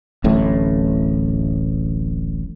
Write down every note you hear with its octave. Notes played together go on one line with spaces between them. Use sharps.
D1 A1 A2